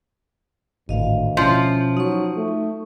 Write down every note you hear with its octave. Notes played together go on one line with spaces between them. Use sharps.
G#1 D2 A2 D#5 F5
B2 F3 C#4 E4
F#3 D#4 C#6 D#6
A3